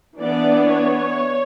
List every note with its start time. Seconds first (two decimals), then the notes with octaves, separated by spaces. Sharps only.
0.20 E3 B3 D4 D5
0.70 C#5